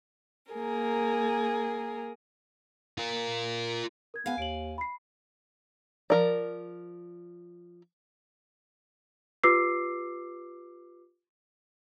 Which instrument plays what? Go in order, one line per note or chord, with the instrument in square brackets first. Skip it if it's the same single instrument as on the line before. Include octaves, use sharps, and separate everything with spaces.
[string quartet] A#3 G#4 A#4
[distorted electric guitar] F4 A#4
[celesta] A#4 G#6
[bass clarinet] B3 [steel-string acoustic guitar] F5 G#5
[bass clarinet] D#2 [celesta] D7 F#7
[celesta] B5 C7
[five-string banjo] F3 A#4 D5
[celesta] F4 G4 B4 D6 E6 C7